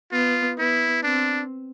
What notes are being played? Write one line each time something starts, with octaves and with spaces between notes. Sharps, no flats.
B3 F4
B3 E4
C4 D4